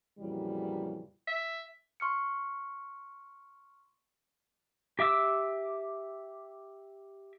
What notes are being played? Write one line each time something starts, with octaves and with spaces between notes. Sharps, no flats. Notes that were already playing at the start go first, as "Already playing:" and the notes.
F2 A#2 C#3 E3 F#3 G3
E5
C6 C#6 F6 C#7
G4 E5 D6 E6